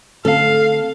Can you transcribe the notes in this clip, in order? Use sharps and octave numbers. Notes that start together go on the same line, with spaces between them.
D3 A3 C4 A4 F5